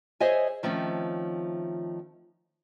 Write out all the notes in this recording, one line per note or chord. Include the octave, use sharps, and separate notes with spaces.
G#4 C5 C#5 D#5 E5 G#5
D#3 F3 A3 C4 C#4